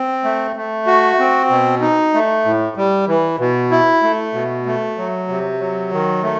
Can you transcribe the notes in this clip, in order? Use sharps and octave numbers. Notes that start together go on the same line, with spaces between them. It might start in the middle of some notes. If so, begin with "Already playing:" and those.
Already playing: C4
A3
A3
F#4
C4
B2
D#4
A3
A2
G3
E3
B2
E4
A3
B2
A3
F#3
C3
F#3
D#3
A3